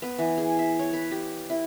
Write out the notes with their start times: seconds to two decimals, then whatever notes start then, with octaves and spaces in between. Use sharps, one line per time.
0.02 B3
0.18 E3
0.38 G#4
0.59 E5
0.79 C#5
0.93 B4
1.11 G4
1.50 E4